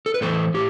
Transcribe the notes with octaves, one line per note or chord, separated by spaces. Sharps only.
A4
B4
A2 E3 A4 C5
A2 G4